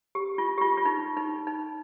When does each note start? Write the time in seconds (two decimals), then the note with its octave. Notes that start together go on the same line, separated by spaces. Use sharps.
0.15 G4
0.38 F4
0.58 G4
0.61 F4
0.77 F4
0.85 D#4
1.17 D#4
1.47 D#4